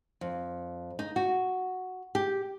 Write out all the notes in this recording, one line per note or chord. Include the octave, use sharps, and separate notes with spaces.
F2
D#4
F#4
G4